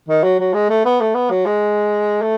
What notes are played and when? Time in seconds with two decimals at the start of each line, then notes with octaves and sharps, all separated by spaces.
0.09 D#3
0.23 F#3
0.40 F#3
0.54 G#3
0.70 A3
0.85 B3
1.01 A3
1.15 B3
1.31 F#3
1.46 G#3
2.22 A3